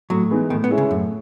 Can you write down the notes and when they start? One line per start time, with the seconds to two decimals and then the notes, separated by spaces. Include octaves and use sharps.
0.10 A2 F#3
0.31 E3 G#3 B3 D#4
0.50 A2 D#3
0.64 B3
0.70 G#3 C#4 E4 G#4
0.78 C#3
0.90 F#2 A2